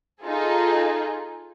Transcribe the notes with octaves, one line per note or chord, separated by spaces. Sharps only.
D#4 F4 G#4 A4